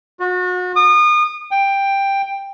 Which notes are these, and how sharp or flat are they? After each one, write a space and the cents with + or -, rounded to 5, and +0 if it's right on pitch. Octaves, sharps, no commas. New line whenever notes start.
F#4 -35
D#6 -35
G5 +10